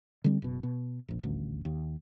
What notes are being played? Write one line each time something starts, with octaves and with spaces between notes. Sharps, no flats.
D3 G3 C4
F#1 B2
B2
F1 A#1
D#1 A1 D2
D#2